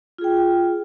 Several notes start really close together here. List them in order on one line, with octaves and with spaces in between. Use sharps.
F4 G#4 G5